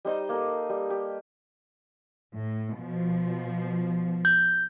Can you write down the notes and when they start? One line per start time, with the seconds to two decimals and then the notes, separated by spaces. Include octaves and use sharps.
0.05 G3 D#4 C5 D#5
0.29 A#3 A4
0.69 G3
0.90 G4
2.35 A2
2.75 B2 F3
4.25 G6